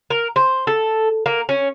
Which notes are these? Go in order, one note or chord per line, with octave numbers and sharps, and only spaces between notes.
A#4
C5
A4
A#3
C#4